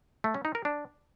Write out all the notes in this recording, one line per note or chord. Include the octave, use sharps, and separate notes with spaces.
A3
C#4
D#4
A#4
D4